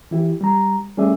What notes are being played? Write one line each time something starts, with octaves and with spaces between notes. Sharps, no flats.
E3 E4 G4
G3 A#5
G3 A3 C#4 G#4 D5 E5